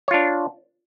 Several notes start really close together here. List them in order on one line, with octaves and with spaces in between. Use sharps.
C#5 F4 D4